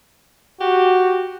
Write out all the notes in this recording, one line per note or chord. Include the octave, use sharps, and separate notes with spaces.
F#4 G4